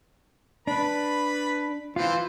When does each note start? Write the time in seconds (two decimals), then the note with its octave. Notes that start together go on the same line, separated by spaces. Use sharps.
0.67 D4 B4 B5
1.96 E3 F4 C5